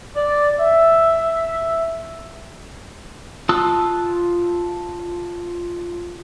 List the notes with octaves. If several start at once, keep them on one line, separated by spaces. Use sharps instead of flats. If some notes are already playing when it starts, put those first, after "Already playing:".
D5
E5
F4 A5 D#6 E6 F#6